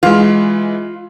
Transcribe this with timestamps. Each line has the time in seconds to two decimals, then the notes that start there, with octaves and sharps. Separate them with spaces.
0.03 E3 G#3 F4